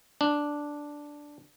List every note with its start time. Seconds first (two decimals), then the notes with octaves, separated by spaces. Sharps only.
0.21 D4